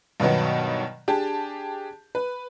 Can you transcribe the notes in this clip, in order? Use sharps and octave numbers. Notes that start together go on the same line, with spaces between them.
G2 B2 D#3 F#3 B3
D4 G4 G#4 A5
B4